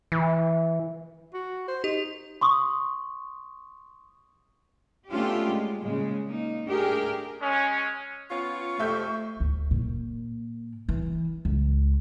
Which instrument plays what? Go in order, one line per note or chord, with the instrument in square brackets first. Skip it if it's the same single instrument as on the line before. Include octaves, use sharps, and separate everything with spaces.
[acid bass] E3
[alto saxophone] F#4
C5
[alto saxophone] D#4 [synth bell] G4
[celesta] C6 C#6 D#6
[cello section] A3 B3 C#4 D4 F4 G4
G#3
A#2 C#3 G#3
A#3 D#4
A3 D4 G4 G#4 A#4
[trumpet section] G#3 C#4
[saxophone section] B3 C#4 F4 [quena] C#6
[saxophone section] F2 C3 [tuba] A3 [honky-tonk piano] E5 G6
[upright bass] D2
A#2
E3
C#2